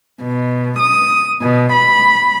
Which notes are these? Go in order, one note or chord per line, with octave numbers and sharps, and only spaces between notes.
B2
D#6
B2
B5